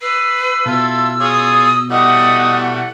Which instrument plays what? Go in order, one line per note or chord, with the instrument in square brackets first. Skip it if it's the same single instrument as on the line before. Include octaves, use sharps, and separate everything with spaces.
[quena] B4 [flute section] E6 [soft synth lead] C7
[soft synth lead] B2 [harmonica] E4 F4 A4
[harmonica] F4 G#4 C#5 [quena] D#6
[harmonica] E3 G3 A3 [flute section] D#5 D#6 [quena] F#5